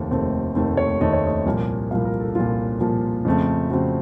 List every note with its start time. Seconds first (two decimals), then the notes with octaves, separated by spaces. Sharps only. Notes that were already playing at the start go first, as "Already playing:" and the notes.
Already playing: F1 D#2 D#3 A3 C4
0.11 F1 D#2 D#3 A3 C4
0.55 F1 D#2 D#3 A3 C4 C5
0.77 C#5
1.00 F1 D#2 D#3 A3 C4 D#5
1.13 C#5
1.27 D#5
1.46 C2 A#2 F3 A#3
1.91 C2 A#2 F3 A#3 F5
2.05 A#4
2.20 A4
2.35 C2 A#2 F3 A#3 F4
2.80 C2 A#2 F3 A#3
3.25 F2 C#3 A3 C4
3.70 F2 C#3 A3 C4 F#4